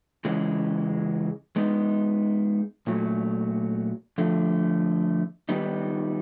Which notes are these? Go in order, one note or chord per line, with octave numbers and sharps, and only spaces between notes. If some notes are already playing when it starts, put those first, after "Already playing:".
C#3 E3 G#3 C#4
G#3 B3 D#4
A#2 F#3 A3
D3 F3 A3
D#3 G3 B3 D#4